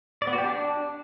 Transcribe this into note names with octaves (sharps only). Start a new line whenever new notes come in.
D5
B3
F#4
G4
D4